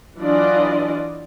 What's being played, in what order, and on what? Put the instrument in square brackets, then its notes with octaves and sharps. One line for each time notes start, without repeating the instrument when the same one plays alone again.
[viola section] E3 F#3 D4 F4 D5 D#5